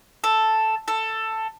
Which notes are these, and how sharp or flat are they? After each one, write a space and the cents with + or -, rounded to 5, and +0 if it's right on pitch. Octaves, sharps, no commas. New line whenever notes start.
A4 +0
A4 +10